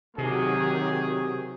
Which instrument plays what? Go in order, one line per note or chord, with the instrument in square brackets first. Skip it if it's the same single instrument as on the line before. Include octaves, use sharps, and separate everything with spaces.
[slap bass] C3 [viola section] D#3 F#3 G4 [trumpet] G#4